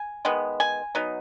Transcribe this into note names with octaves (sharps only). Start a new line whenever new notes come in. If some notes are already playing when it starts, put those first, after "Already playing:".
Already playing: G#5
D#3 G#3 B3
G#5
F#3 B3 D#4